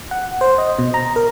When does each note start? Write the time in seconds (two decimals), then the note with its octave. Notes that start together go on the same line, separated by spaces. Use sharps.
0.11 F#5
0.41 C5
0.58 D#5
0.79 B2
0.94 A#5
1.16 A#4